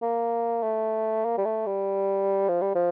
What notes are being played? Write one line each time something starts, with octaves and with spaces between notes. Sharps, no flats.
A#3
A3
A#3
G3
A3
G3
F3
G3
F3